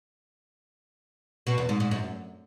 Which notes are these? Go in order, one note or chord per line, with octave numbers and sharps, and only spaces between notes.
B2
E2
G#2
G#2
F#2